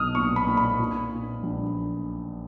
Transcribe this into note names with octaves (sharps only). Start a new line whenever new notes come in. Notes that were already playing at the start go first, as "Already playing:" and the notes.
Already playing: B1 B3 D#6 F6
A#2 C#6
B5
A#2
B5
A#2
A#2
A#1